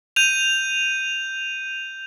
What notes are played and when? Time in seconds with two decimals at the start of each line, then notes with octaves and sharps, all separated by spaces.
0.16 G6 D#7 F7